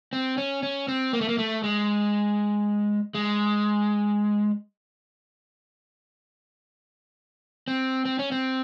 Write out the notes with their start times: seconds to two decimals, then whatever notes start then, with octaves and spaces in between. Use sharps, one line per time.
0.13 C4
0.38 C#4
0.63 C#4
0.88 C4
1.13 A#3
1.21 A3
1.29 A#3
1.38 A3
1.64 G#3
3.15 G#3
7.68 C4
8.05 C4
8.19 C#4
8.32 C4